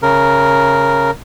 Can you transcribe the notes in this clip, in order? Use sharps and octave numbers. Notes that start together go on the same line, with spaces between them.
C#3 A#4